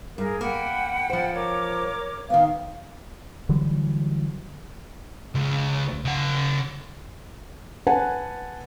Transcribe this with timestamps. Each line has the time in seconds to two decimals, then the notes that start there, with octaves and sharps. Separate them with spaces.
0.18 G2 G#4 A#4
0.41 A#3 F#5 G5 B5
1.10 F3 C5
1.34 A#4 C#5 D6
2.30 D#3 B3 F5
3.49 D3 E3 F#3 G3
5.35 C#2
6.05 C#3 F#5
7.87 B4 F#5 G#5 A5